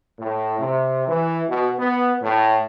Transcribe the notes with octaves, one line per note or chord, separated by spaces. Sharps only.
A2
C3
E3
B2
B3
A2